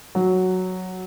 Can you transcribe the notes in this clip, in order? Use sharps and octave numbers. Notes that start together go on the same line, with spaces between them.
F#3